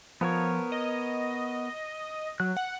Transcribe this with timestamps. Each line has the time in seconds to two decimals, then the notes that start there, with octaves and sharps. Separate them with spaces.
0.21 F3 B3 A#4 C#5
0.72 D#5
2.40 F#3 F#6
2.57 F#5